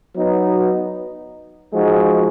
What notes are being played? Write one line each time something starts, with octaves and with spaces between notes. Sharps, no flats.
F#3 B3 D#4
F3 G#3 D#4 F#4